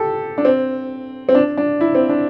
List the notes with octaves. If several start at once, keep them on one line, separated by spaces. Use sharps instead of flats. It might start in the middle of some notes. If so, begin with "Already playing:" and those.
Already playing: G4 A4
D4
C4
C4
D4
D4
E4
C4
D4